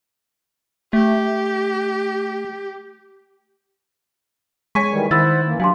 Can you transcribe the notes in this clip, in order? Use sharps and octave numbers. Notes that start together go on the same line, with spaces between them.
A3 G4
G#3 C#5 G#5 C#6 B6
D#3 E3 G3
D#3 E4 C5 F#5 B5 E6 A6
F#2 E3 A#3
F#3 D4 G4 F5 G#5 C6